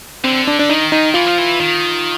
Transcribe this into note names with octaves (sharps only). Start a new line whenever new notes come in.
D3 C4
D4
D4
D#3 D#4
D#4
E3 F4
F3
E3
D#3